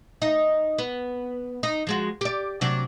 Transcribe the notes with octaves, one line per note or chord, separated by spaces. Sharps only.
D#4 D#5
B3
D#4
F3 G#3 F#4
G4 D5
C3 F#3 D4